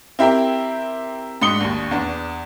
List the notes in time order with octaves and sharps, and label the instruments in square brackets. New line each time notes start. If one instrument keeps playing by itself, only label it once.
[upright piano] C4 E4 G4 A#4
G#2 D4 D#6 C#7 G7
A#1 D#2
E2 D4